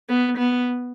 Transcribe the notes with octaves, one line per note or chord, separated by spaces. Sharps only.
B3
B3